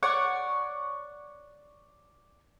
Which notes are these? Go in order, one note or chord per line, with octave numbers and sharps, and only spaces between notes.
C#5 D5 F#5 C#6